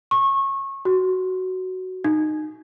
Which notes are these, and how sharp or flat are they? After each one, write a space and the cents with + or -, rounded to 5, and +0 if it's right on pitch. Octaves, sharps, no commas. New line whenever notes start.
C#6 -25
F#4 +5
D#4 -20